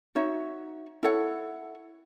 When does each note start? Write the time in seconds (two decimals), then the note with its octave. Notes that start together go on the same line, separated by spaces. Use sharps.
0.15 D#4 F#4 C#5 E5
1.03 E4 A4 C#5 F#5